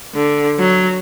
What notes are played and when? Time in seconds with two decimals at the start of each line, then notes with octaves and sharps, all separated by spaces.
0.15 D3
0.59 F#3